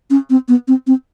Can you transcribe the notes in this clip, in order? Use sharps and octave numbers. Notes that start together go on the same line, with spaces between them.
C#4
C4
B3
C4
C4